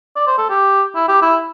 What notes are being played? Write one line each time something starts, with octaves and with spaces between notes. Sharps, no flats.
D5
C5
A4
G4
E4
G4
E4